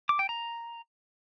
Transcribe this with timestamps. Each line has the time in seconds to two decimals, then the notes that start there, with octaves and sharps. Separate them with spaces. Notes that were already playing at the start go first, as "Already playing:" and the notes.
0.09 D6
0.19 G5
0.29 A#5